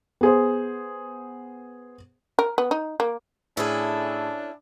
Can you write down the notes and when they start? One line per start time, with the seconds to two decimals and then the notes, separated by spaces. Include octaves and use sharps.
0.21 B3 G#4 C5
2.39 A#4
2.58 B3
2.71 D#4
3.00 A#3
3.57 A2 C#4 D4 E4 G#4 A4